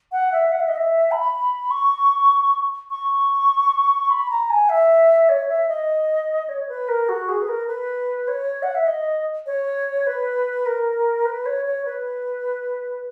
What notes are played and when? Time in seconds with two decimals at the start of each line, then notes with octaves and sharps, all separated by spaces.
0.12 F#5
0.32 E5
0.52 F#5
0.60 E5
0.68 D#5
0.76 E5
1.11 B5
1.71 C#6
2.90 C#6
4.10 B5
4.30 A#5
4.50 G#5
4.69 E5
5.29 C#5
5.49 E5
5.69 D#5
6.49 C#5
6.69 B4
6.88 A#4
7.09 F#4
7.29 G#4
7.42 B4
7.48 A#4
7.67 B4
8.28 C#5
8.63 F#5
8.75 E5
8.87 D#5
9.46 C#5
10.07 B4
10.66 A#4
11.25 B4
11.46 C#5
11.65 C#5
11.85 B4